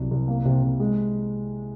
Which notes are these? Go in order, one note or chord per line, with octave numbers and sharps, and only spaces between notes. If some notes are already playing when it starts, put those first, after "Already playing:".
Already playing: C2 F#3
C2
A#3
C3
C3
G#3